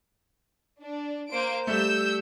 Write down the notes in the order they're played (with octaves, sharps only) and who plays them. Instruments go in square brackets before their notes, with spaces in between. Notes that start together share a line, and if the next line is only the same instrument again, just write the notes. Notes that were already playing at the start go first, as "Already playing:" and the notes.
[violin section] D4
A#3 C5 D7
[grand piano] G3 A3 [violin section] E6 G6